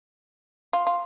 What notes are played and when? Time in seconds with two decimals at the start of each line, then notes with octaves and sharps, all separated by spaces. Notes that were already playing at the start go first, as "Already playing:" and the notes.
0.73 F4
0.87 F4